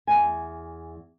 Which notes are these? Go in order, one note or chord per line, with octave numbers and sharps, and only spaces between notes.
E2 G#5